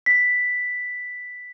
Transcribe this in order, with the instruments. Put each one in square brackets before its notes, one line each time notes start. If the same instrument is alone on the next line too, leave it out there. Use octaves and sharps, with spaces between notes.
[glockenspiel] B6